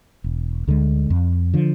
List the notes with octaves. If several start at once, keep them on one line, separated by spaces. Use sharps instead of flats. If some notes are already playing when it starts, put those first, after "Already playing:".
E1
D2 D3 G#3
F2
D3 F3